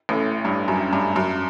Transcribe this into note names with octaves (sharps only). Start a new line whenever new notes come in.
A1 A2
G2
F#2
G2
F#2